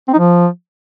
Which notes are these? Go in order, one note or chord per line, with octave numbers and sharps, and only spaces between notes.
C4
D#4
F3